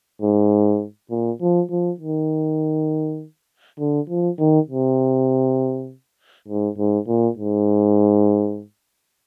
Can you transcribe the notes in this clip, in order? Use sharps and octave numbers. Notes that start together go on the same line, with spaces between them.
G#2
A#2
F3
F3
D#3
D3
F3
D#3
C3
G#2
G#2
A#2
G#2